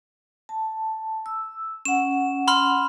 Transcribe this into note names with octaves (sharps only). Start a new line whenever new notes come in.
A5
E6
C#4 F#5 E7
B5 C6 F6